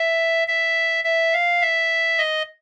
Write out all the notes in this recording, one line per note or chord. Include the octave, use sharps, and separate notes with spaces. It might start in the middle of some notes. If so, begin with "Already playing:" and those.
Already playing: E5
E5
E5
F5
E5
D#5